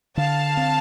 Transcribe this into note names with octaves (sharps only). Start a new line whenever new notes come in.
D3 F5 A5
C4